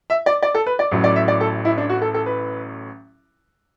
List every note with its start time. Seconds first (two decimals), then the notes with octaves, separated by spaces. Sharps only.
0.10 E5
0.26 D5
0.42 D5
0.54 A4
0.66 B4
0.79 D5
0.91 A1 A2 F#3
1.04 D5
1.16 E5
1.28 D5
1.41 A4
1.65 E4
1.78 D4
1.89 F#4
2.02 A4
2.14 A4
2.26 B4